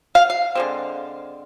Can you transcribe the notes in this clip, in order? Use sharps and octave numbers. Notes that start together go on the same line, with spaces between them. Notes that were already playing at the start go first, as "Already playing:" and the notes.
F5
F5
D3 G#3 C4